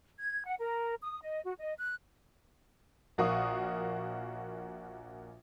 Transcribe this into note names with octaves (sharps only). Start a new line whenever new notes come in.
G#6
F#5
A#4
D#6
D#5
F#4
D#5
F#6
A#1 F#4 A#4 F5 C#6 D#6